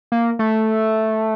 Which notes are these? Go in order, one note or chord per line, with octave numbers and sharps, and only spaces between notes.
A#3
A3